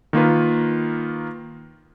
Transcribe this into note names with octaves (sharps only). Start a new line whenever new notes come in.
D#3 A#3 F4 B4